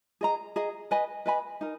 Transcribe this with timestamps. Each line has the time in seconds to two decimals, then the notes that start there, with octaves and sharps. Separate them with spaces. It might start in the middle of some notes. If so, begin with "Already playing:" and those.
0.21 G#4 D#5 A#5
0.56 G#4 D#5 A#5
0.91 B4 D#5 G#5 B5
1.26 B4 D#5 G#5 B5
1.61 D#4 A#4